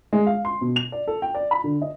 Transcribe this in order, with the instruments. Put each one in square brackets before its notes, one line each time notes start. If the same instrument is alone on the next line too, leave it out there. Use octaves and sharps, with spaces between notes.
[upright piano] G#3
F5
C6
B2
F7
D5
A4
G5
D5
B5
D3
D#5